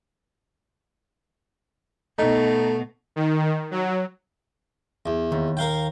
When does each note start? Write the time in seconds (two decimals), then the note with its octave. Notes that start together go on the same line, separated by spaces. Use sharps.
2.19 B2 A3 D#4
3.16 D#3
3.71 F#3
5.06 E2
5.32 D#2
5.57 A#4 F5 G5